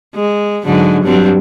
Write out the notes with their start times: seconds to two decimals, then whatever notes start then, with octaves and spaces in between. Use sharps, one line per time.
0.15 G#3
0.65 G#2 D3 F#3
1.04 G2 F#3 C4